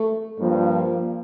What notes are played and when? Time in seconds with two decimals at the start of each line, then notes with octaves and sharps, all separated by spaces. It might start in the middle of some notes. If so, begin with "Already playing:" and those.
Already playing: A3
0.38 G2 F3 A#3